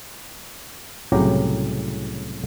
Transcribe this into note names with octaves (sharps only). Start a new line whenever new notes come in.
C2 A2 C#3 F#3 G4 A#5